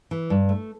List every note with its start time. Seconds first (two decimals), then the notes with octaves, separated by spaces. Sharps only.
0.11 E3
0.30 G2
0.49 A3